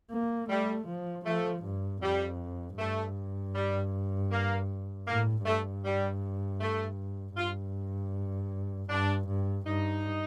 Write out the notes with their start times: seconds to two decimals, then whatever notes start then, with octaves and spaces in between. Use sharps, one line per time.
0.11 A#3
0.49 G3 A3
0.88 F3
1.26 F3 A3
1.64 G2
2.02 F2 G3
2.78 G2 A3
3.55 G3
4.31 A#3
5.08 A2 A#3
5.46 G2 A3
5.84 G3
6.61 A3
7.37 G2 F4
8.90 G2 D4
9.28 G2
9.66 G2 D#4